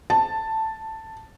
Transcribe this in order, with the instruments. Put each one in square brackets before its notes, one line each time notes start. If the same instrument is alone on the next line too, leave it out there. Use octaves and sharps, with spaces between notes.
[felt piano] A5